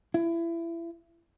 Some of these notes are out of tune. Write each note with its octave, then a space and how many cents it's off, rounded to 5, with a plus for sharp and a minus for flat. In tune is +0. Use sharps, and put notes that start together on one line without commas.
E4 +25